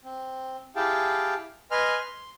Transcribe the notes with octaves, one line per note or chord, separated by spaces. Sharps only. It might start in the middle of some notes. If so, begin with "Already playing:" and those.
C4
E4 G4 G#4 F5 G5 A5
B4 D#5 G#5 C6 F6
C6